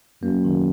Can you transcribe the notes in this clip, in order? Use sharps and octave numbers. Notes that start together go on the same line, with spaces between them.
F#2 A#3
D#3